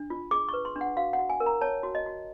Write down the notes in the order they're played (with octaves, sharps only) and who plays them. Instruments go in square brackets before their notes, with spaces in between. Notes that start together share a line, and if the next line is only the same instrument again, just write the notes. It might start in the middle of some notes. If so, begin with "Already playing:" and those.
Already playing: [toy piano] D4
F4
G#4 D6
B4 C#6
C6
D4
F#5
F#4 F5
F#5
F#4
G#5
A#4
A#5
C#5 A5
F#4
D#5
F#4